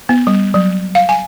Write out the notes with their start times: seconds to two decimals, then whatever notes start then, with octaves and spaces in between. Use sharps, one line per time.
0.09 B3
0.27 G3
0.54 F#3
0.95 F5
1.09 G#5